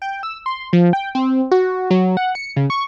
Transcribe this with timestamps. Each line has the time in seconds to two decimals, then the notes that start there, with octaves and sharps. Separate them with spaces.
0.02 G5
0.23 E6
0.46 C6
0.73 F3
0.93 G5
1.15 C4
1.51 F#4
1.91 F#3
2.17 F#5
2.35 C#7
2.57 C#3
2.70 C#6